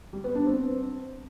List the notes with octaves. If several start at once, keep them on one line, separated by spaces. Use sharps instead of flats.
G3
B3
D4
C4